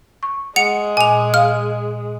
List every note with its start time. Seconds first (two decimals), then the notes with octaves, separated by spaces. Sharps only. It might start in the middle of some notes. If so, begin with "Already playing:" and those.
0.23 C#6
0.56 G#3 F#5 C#7 F7
0.97 A#2 G#5 F7
1.34 F5 F6